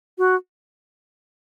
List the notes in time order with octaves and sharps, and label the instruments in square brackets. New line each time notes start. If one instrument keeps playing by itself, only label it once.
[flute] F#4